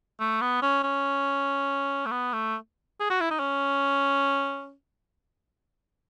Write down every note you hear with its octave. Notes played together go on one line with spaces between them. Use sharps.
A3
B3
C#4
C#4
A3
B3
A3
G#4
F#4
E4
D#4
C#4